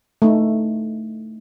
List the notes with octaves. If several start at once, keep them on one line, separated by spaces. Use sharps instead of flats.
A3 D#4